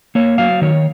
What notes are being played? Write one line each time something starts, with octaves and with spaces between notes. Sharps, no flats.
A#3 C#5
F#3 F5
D#3 C#5